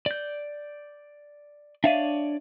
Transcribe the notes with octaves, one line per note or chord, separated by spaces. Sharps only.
D5 G6
D4 C#5 D5 E5 F5 D#7